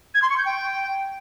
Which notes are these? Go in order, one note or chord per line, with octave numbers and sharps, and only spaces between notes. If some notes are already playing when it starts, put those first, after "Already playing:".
G#6
C6
C#6
G6
G5